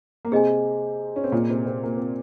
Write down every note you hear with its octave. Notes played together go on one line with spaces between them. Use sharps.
A#3
C3 C4 G#4 D#5 G#5
C#4
C4
A#2 A#3
C3 C4
C3 C4
A#3
C4